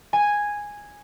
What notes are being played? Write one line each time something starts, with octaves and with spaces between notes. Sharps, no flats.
G#5